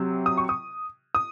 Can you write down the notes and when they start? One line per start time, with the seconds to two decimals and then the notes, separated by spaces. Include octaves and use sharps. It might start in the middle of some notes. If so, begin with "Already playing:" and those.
Already playing: C3 F#3 C4
0.26 D#6
0.37 C#6
0.49 D#6
1.15 D#6